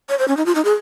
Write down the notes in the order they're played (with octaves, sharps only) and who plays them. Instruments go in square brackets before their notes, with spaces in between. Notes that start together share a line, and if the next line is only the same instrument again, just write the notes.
[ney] C#5
C5
C#4
D#4
F4
D#4
G#4